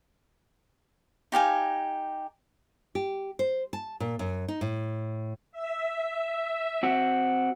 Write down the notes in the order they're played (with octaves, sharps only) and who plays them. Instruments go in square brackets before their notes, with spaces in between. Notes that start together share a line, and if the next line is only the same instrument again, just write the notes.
[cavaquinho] D#4 G4 F5 G#5
[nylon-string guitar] G4
C5
A5
A#2
F#2
D#4
A2
[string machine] E5
[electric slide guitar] C4 F#4